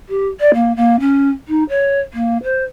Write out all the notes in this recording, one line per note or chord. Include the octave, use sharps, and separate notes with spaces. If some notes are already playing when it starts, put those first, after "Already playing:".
G4
D5
A#3
A#3
C#4
D#4
C#5
A#3
C5